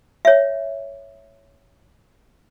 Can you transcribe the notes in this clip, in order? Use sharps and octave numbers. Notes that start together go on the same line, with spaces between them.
C#5 E5